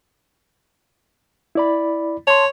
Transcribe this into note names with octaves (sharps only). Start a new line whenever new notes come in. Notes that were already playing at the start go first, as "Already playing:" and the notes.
E4 D5 B5
C#5 A5 C6